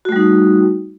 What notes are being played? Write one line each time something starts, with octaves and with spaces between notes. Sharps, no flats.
G3 A3 D#4 F#4